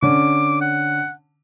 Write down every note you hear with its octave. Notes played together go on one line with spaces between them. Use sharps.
D3 C#4 D6
F#5